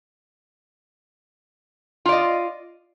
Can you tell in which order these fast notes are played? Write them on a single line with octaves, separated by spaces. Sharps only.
F4 D5 D#5